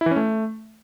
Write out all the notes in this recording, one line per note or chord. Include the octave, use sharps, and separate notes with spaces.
E4
E3
C#4
A3